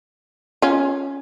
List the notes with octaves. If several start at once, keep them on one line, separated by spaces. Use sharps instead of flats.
C#4 F4